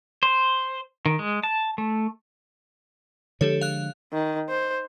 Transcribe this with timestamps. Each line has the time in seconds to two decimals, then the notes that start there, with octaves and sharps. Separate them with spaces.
0.23 C5
1.06 D#3
1.19 G#3
1.44 A5
1.78 A3
3.41 D3 F3 G#3 G4 A4 C#5
3.61 F5 F#6
4.13 D#3
4.49 C5